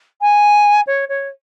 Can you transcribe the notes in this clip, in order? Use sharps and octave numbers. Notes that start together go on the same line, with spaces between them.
G#5
C#5
C#5